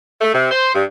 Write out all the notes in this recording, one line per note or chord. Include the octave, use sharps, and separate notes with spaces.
A3
C3
C5
G2